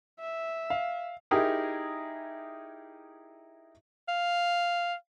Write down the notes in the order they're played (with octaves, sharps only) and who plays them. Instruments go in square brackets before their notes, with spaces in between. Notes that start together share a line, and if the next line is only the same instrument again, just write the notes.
[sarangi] E5
[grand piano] F5
[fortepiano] D#4 E4 G4 G#4 A#4
[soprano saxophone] F5